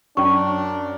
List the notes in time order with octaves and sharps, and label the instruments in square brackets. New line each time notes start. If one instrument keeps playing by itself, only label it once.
[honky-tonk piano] F#2 [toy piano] C#4 C#6 [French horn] D4